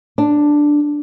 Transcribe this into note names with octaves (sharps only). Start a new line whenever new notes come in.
D4